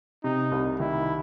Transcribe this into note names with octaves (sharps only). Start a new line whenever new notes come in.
C3 D#4
C2
D#3 E4